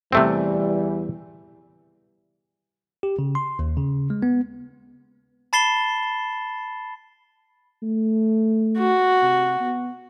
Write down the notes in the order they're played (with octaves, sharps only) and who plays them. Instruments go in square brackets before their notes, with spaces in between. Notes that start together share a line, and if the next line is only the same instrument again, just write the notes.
[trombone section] E2 E3 G3 [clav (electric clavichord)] C3 A3 C4
[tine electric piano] G4
C#3
C6
D#2
C#3
G#3
B3
[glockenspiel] A5 B5 A6 C7 E7 G7
[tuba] A3
[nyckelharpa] F#4
[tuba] C3
B3